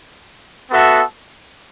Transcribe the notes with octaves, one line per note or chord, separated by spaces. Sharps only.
B3 F#4 A4 E5